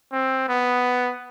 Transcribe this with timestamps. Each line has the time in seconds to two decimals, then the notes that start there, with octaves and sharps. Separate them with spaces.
0.12 C4
0.48 B3